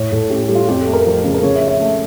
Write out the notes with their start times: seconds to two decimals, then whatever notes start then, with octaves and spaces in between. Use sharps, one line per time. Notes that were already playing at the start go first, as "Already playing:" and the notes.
Already playing: A2 C#5
0.12 A2 A4
0.30 C#4 G4
0.44 A4
0.49 G3
0.55 F4
0.68 F2 G4
0.80 A4
0.87 A3
0.94 A#4
1.06 F3
1.24 C#3
1.35 A#4
1.43 C#3 C#5
1.55 E5
1.61 C#4
1.68 E5
1.80 A3